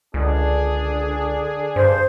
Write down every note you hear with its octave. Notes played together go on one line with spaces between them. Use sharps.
C#2 D3 D4 G#4
G2 C5